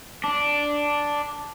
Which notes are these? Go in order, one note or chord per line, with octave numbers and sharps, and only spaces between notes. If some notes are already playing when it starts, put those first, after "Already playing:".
D4